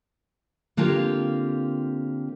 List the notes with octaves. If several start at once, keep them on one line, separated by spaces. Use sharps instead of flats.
D3 A#3 C4 F4 G4